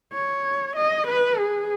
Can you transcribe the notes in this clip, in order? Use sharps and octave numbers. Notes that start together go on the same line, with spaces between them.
C#5
D#5
B4
G#4